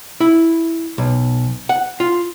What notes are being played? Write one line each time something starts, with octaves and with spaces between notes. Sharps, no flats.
E4
B1
F#5
F4